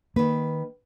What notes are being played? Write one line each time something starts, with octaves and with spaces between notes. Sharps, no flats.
D#3 A#3 B4